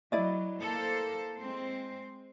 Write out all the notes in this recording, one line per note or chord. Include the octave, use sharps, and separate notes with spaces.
F#3 E4 D5 D#5
A#3 A4 C5
G#3 C4 C5